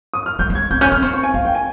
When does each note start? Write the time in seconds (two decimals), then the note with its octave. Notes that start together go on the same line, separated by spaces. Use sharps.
0.14 D#6
0.26 F6
0.39 G3 G6
0.50 G3
0.55 G#6
0.71 C4 G6
0.81 C#4 G6
0.92 C#4 F6
1.02 C4 C#6
1.14 C#6
1.23 G#5
1.34 C4 F5
1.45 G5
1.55 G#5